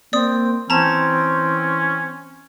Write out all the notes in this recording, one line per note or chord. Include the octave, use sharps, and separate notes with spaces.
A#3 C4 D5 D#6
E3 C4 C#4 A5 A#5